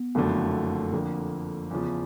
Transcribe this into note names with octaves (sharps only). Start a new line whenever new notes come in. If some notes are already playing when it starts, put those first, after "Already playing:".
Already playing: B3
F#1 F2 D3 F#3 A3
F2 D3 F3 A#3
E2 C#3 F3